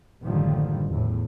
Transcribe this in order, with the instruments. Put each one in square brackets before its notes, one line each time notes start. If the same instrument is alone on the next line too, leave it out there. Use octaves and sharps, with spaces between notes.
[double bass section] F#1 A2 D3 D#3 F3 G3
E2 A2